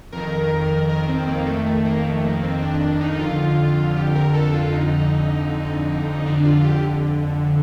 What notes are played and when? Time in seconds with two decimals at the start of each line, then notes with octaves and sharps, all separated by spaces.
0.12 F2 D#3 A#4
0.89 A#4
1.09 C4
1.28 A#3
1.46 A3
1.66 A3
1.85 A#3
2.04 A3
2.24 A#3
2.43 C4
2.62 D4
2.81 D4
3.01 D#4
3.19 F2 D3 F4
3.96 G4
4.15 A#4
4.34 A4
4.54 F4
4.73 D#4
6.26 F2 D3 D4
6.45 F4
6.65 G4